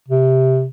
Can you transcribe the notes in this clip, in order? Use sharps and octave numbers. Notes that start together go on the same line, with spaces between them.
C3